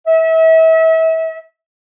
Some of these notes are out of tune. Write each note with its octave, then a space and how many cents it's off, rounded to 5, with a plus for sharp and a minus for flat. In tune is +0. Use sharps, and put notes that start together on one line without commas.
E5 -35